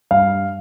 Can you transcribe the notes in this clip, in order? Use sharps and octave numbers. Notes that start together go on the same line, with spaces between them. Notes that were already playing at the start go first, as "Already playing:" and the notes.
G2 F5